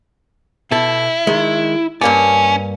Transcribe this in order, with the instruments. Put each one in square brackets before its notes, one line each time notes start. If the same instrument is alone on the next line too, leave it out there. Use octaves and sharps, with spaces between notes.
[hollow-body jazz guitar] B2 A4 [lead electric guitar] E4
[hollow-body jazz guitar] D#3 G#3
[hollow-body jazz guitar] G2 A#3 D5 [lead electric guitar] C#4